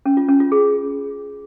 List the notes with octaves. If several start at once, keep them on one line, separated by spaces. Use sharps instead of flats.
C#4
F4
C#4
F4
G#4